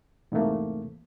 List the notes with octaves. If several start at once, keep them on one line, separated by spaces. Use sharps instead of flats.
E2 G#2 C3 A3 A#3